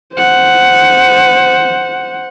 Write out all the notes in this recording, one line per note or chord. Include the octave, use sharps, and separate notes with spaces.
C5 F#5